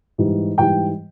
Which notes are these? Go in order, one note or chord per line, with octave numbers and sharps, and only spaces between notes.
G#2 E3 G3
G#2 E3 G3 G5